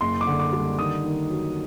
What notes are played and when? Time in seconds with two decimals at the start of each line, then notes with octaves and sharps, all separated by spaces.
0.01 F#1 C6
0.21 D6
0.27 D3
0.40 D6
0.53 G3
0.79 D#3 D#6
1.04 D#3
1.30 F#3